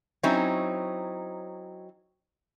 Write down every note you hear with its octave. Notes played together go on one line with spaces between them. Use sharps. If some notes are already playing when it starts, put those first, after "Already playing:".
F#3 C4 C#4 D#4 E4